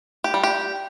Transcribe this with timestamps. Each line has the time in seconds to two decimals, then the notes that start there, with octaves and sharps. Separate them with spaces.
0.24 G4
0.34 G3
0.43 G4